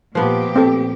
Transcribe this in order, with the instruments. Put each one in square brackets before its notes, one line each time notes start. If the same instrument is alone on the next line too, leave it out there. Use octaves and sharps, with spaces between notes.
[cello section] A#2 A#3 G4 [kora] F3 B3
[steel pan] C4 A4